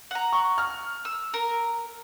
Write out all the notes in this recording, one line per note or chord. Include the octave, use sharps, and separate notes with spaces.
F#5 A#5
C#6
F6
E6
A#4